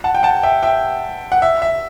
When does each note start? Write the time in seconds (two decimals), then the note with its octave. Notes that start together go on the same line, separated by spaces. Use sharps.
0.04 F#5 A5
0.15 G5
0.23 F#5 A5
0.43 E5 G5
0.63 E5 G5
1.32 F#5
1.42 E5
1.62 E5